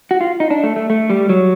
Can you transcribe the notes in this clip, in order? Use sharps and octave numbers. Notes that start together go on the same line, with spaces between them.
F#4
F4
D#4
D4
A3
A3
A3
G3
F#3